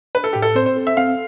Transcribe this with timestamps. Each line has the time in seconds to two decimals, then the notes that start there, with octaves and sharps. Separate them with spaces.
0.15 D4 B4
0.24 A4
0.33 A2 G4
0.42 A4
0.55 C4 C5
0.66 C5
0.77 A4
0.87 E5
0.97 C4 F5